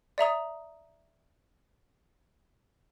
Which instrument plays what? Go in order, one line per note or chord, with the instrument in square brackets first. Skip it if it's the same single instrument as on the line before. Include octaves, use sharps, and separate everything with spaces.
[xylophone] D5 E5 A#5 D#6